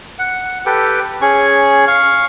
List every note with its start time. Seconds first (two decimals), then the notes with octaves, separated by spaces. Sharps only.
0.19 F#5
0.66 G4 A4 B4 G5
1.21 C#4 G#4 C#6
1.87 F5 C#6